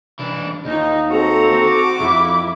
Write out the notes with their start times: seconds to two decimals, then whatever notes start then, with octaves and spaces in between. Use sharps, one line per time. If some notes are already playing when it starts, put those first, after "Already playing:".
0.19 E3 D4
0.65 D#2 D#4
1.10 C4 F#4 A4 A#5
1.70 D6
2.00 F2 E4